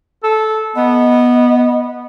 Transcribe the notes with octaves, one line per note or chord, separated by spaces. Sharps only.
A4
B3 D#5